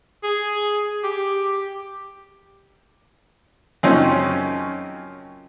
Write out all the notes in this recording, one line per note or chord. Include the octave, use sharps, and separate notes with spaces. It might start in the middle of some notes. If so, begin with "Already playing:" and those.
G#4
G4
F#2 C#3 F3 C4 C#4 D#4